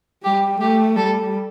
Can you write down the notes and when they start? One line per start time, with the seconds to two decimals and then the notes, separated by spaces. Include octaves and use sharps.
0.24 G3 G4
0.60 A3 G4
0.96 G3 A4